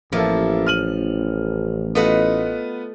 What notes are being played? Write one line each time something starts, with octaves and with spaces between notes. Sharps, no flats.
A1 F3 A#3 E4 A4
F6 D#7 F#7
A3 B3 F4 B4 D#5 F#5